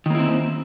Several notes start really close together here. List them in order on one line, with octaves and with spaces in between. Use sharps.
D#3 A#3 E4 C4